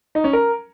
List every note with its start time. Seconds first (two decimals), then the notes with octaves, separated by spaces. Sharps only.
0.15 D#4
0.24 C#4
0.33 A#4